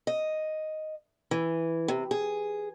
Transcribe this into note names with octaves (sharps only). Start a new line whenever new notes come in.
D#5
E3
C3
G#4